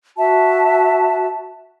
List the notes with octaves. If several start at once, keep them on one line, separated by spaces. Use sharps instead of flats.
F#4 E5 A5